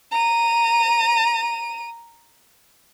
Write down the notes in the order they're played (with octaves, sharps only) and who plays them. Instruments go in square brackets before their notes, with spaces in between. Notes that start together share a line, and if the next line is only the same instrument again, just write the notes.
[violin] A#5 D#7